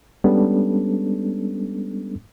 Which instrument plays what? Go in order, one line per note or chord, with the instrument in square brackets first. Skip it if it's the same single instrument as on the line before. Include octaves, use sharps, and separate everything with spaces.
[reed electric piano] G3 G#3 B3 C#4 D4 A4